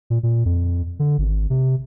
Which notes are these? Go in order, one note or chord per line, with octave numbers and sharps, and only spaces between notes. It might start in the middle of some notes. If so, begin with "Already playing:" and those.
A#2
A#2
F2
D3
G#1
C3